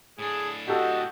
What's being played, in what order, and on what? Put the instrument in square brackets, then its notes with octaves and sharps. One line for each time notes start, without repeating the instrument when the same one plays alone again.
[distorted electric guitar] A2 D4 [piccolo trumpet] G#4
[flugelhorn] F#4 [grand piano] G4 A4 [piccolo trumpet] D#5